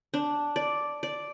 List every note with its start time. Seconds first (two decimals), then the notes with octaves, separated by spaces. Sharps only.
0.14 D4
0.56 D5
1.03 D5